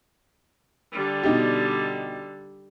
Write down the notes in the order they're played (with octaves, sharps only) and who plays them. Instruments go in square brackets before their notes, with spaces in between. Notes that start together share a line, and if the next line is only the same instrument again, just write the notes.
[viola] D3 G3
[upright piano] B2 D#4 G4